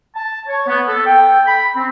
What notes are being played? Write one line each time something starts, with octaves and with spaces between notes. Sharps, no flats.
A5
C#5
B3
A4
G5
B5
C4